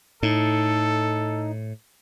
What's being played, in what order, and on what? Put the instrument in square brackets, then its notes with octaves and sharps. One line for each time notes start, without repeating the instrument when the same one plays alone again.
[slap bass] A2 [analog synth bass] D#4 [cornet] A4